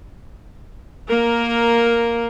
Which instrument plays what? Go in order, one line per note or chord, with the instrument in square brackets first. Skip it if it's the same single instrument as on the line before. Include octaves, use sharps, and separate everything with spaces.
[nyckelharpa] A#3 A#4